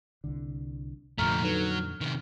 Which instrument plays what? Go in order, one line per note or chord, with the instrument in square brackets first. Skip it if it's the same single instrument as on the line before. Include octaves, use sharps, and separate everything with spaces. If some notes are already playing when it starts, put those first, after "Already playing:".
[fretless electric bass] C2 D3
[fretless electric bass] F2 A#2 D3 [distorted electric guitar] F3 A3 [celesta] A#5 C#6 F6
[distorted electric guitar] F#3 [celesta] D#4 A4 B4
[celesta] F6
[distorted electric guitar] C3 D#3